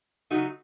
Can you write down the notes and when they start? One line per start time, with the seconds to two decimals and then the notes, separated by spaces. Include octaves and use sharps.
0.30 C#3 F#3 A3 D#4 F#4